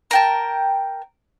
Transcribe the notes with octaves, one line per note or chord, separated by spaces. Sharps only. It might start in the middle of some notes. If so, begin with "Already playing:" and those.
A#4 G5 A5